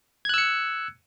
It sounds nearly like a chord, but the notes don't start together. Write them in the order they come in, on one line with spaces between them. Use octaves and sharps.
G#6 F#6 E6 C#7